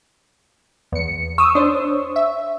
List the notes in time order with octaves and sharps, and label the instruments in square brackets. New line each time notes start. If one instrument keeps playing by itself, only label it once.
[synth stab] E2 C#7
[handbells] C#6 [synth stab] D#6 E6
[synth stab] D4 C5 C#5
E5